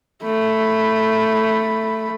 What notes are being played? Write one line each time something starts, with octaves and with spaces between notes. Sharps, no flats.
A3 B5